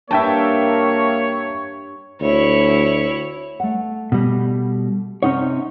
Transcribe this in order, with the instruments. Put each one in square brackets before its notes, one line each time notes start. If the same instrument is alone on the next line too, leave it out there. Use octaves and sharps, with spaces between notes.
[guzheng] G2 [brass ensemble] A#3 [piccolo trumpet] C#5 [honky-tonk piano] E5 G5 A5
[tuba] D2 [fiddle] E4 C#5
[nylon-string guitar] A3 F#5
[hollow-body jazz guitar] B2 G3
[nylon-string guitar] C3 C4 F#5 [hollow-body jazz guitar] C#4 D#4 C#5